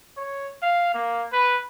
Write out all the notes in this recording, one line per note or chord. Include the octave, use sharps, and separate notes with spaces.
C#5
F5
A#3
B4